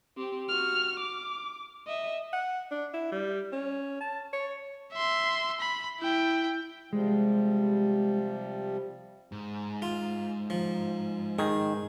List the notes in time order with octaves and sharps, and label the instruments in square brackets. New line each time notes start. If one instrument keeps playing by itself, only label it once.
[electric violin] C4 G4
F#4 F6
D6
D#5 E5
[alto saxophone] F#5
D4
E4
G3
C#4
A5
C#5
[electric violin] E5 C6
B5
E4 G5
[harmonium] C3 F3 G3 [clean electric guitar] G#3
[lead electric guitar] G#2
[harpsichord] F4
F3
[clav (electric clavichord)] D#3 [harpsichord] G#4